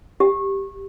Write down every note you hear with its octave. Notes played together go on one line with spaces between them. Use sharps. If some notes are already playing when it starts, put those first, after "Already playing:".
G4